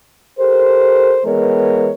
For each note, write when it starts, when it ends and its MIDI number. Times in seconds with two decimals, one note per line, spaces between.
0.38 1.19 67
0.38 1.19 69
0.38 1.19 70
0.38 1.19 72
1.25 1.91 52
1.25 1.91 56
1.25 1.91 59
1.25 1.91 70
1.25 1.91 73